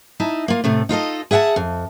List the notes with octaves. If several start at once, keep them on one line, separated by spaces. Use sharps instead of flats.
D#4 E4 A5
A#3 F4
A2 C3 A3
D#4 F4 A4 D#5
G#4 E5 F#5 G5 A5
F2